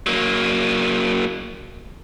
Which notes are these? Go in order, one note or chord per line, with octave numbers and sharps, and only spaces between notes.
F#3 A#3